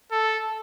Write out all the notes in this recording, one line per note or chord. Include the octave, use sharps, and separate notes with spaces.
A4